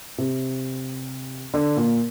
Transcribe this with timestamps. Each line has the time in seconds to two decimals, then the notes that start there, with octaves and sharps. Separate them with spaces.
0.18 C3
1.54 D3
1.76 A#2